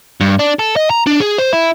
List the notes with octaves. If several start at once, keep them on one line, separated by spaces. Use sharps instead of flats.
G2
D4
A4
D#5
A#5
D4
G#4
C5
E4